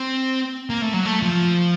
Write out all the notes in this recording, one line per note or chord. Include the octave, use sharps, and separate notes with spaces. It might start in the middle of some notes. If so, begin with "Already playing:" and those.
Already playing: C4
A#3
A3
F#3
A3
F3